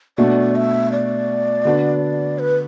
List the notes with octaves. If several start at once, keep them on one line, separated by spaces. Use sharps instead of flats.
B2 A3 D4 F#4 D5
E5
D5
D3 B3 D4 F#4
B4